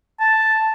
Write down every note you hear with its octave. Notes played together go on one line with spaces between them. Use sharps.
A5